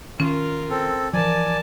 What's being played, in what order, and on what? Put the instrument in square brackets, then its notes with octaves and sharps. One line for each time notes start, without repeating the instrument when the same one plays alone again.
[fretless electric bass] D#3 [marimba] C#4 [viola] F4 A#4
[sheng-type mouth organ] C4 A4
[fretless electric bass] E3 F3 [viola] A#4 A5 [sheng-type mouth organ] D5 G#5